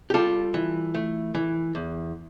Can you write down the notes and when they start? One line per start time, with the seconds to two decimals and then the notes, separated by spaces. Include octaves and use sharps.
0.10 G4
0.14 G3 F4 A4
0.54 E3
0.94 A3
1.35 E3
1.75 E2